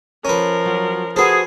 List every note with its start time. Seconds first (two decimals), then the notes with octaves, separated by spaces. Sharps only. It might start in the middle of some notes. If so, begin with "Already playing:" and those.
0.25 F3 C#4 A#4 B4
0.65 F#3
1.16 F#4 G#4 A4 B4 C5